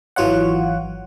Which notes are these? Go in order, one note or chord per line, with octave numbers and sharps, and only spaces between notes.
G#1 E3 F#3 F4 C#5 F#5